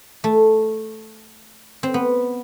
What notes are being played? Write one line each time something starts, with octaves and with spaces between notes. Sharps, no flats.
A3
C4
B3